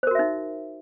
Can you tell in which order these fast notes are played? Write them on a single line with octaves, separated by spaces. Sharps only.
C5 A#4 F#4 E5 D#4